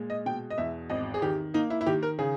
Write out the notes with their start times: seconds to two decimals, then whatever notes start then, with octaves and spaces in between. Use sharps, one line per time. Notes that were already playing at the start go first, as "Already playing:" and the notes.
Already playing: A#2 G#3
0.10 D#5
0.26 B2 G5
0.50 D#5
0.58 E2 E5
0.90 G#1 D#5
1.14 G#4
1.22 D#3 G4
1.54 A#3 D#4
1.70 E4
1.81 E4
1.86 D#3 G4
2.03 A#4
2.19 C#3 G#4